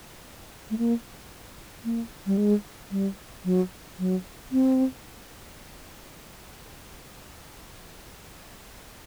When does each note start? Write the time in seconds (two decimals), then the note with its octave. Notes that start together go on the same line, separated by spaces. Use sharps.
0.70 A3
0.78 A#3
1.85 A#3
2.26 G3
2.38 G#3
2.91 G3
3.45 F#3
3.99 F#3
4.52 C4